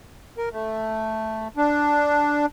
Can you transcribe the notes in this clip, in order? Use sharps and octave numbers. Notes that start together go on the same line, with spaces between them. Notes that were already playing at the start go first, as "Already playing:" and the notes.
A#4
A3
D4